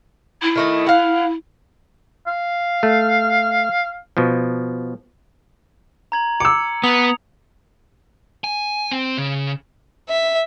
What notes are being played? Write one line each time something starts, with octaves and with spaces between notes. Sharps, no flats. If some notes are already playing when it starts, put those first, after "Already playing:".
E4
D#3 A3 D#5
F5 F#5
F5
A3
B2 F3
A#5 G#6 F#7
D6 E6 C#7
B3 D#6 F7
G#5
C4
C#3
E5